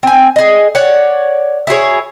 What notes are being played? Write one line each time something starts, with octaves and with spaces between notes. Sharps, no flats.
C4 G#5
G#4 D#5
C#5 D5 F#5
E4 F#4 G#4 C#5